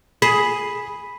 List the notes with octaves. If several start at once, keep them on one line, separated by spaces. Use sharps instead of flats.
G#4 B5